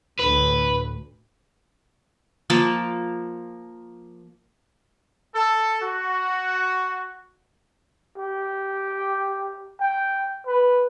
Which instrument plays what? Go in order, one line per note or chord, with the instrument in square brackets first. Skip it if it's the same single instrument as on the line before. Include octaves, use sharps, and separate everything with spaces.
[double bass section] D2 A2 [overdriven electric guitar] B4
[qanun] F3 A#3 A#4 A5
[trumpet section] A4
F#4
[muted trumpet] G4
G5
B4